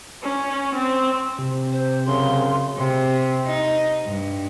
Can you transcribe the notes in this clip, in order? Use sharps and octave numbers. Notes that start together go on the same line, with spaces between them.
C#4
C4
C3
C5
F#2 C#3 C6
C3
D#4
G2